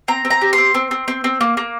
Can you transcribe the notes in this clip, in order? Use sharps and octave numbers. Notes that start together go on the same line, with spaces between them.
C4 A#5
C4
A#5
G4
C6
C4
C4
C4
C4
C4
A#3
A#3